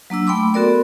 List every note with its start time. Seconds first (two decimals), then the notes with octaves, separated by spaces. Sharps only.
0.10 F#3 A#3 D4 E6
0.27 A3 G5 B5 C6 D6
0.54 B3 F#4 A4 A#4 D5 C6